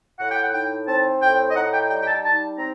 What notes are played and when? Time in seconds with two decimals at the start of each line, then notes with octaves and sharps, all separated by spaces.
0.20 A2 F#5
0.31 G5
0.42 F#5
0.54 D#4 G5
0.88 C4 A5
1.22 A2 G5
1.51 D#5
1.56 D#4 F#5
1.74 G5
1.90 G3 G5
2.02 G5
2.08 A5
2.25 D#4 A5
2.59 C4 A#5